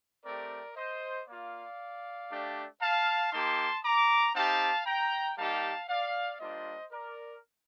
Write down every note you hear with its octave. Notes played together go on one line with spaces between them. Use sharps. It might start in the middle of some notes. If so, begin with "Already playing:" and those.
A3 C4 G4 A#4 D5
C5 D#5
A#3 F4 D5 F5
A3 D4 G4
F5 A5
A#3 D#4 G4 A5 C6
A#5 D6
C4 D#4 G4 F5 A5
G5 A#5
G3 A#3 D#4 G4 F5 A5
D5 F5
G3 A#3 D4 F4 C5 D#5
A#4 D5